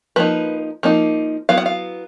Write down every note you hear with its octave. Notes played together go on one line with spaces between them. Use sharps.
F3 A#3 D#4 B4
F3 A#3 D#4
F#3 B3 E4 F5
F#5
F5